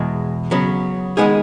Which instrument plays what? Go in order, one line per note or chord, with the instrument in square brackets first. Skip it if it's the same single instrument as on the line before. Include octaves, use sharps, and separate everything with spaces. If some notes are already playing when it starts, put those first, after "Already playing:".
Already playing: [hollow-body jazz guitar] E2 B2 G#3
C#3 F#3 B3
D#3 G#3 B3 D#4 G#4